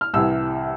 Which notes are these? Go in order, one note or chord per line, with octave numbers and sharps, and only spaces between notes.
F6
C2 C3 E3 E6